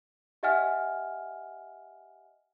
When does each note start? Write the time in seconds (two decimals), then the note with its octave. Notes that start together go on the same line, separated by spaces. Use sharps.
0.43 G4 D#5 E5 F#5 G#5 F6